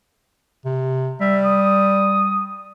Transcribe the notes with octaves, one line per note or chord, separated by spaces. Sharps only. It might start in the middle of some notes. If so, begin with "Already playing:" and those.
C3
G3 E5
D#6